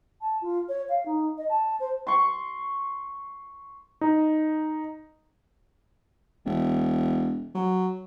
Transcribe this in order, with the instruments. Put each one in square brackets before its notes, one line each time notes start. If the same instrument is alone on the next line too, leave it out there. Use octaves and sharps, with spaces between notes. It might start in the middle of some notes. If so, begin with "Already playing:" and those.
[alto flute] A5
F4
C#5
F5
D#4
D#5
A5
C5
[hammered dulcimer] C6 C#6
[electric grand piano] D#4
[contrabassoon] E1
F#3